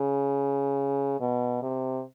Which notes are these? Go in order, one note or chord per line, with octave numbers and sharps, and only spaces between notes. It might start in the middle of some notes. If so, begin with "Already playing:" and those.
Already playing: C#3
B2
C3